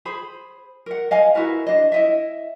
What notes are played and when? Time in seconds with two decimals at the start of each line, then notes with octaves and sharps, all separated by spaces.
0.05 G#4 C5 B5
0.86 A#4 F#5
1.11 D#5 F5 G#5
1.35 E4 F#4 A#4 B4
1.67 D4 D#5
1.92 E4 D#5 E5